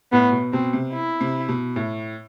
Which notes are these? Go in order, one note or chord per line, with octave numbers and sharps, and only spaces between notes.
A2 B3
B2
B2 C4
C3
E4
C3
B2
A2